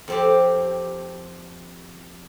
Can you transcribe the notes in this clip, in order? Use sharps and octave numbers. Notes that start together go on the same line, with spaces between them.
F2 C4 G4